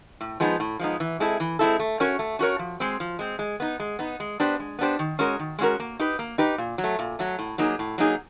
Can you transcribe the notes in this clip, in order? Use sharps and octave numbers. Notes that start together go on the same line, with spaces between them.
A2
F3 G#3 B3 D#4
A2
F3 G#3 B3 D#4
E3
G#3 C4 E4 A4
E3
G#3 C4 E4 A4
A3
C#4 F#4 A#4 C#5
A3
C#4 F#4 A#4 C#5
F3
G#3 C4
F3
G#3 C4
G#3
B3 D#4
G#3
B3 D#4
G#3
B3 D4 G4 C5
G#3
B3 D4 G4 C5
D#3
G#3 C#4 F#4 A#4
D#3
G#3 C#4 F#4 A#4
A#3
D#4 G4 B4
A#3
D#4 G4 B4
A#2
F#3
A3
A#2
F#3 A3
A2
F#3 A#3 D#4 G#4
A2
F#3 A#3 D#4 G#4